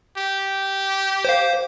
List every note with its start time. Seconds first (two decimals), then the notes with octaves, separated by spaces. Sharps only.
0.18 G4
1.25 C5 F5